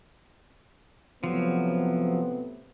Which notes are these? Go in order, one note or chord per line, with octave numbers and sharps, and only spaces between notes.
A2 C3 F3 F#3 B3